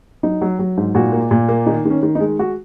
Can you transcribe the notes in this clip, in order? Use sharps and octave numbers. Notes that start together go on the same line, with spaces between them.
F#3 D#4
F#3
F#3
G#2
A#2 F#4
A#3
A#2
A#3
D#3 D#4
D#3 C#4
D#3
D#4
G#3
G#3 F#4